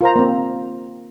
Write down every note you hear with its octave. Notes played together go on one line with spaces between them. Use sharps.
F4 A#4 C5 A#5
A#3 C4